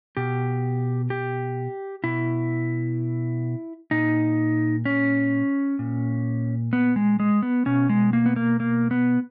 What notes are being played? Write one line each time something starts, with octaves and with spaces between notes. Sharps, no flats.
B2 G4
G4
B2 E4
A#2 D#4
C#4
A#2
B3
G#3
G#3
B3
B2 C#4
G#3
A#3
B3
A#3
A#3
B3